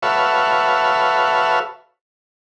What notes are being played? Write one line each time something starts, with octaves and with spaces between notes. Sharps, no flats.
F#4 A4 B4 C#5 E5 F5